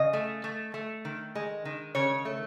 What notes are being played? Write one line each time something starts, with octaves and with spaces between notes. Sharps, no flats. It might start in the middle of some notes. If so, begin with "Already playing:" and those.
Already playing: C#3 D#5
A3
A3
A3
D#3
G#3
D#3
C#3 C#5
A3